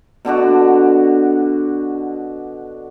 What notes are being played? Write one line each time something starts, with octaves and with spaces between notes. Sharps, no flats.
B2 D3 D4 F#4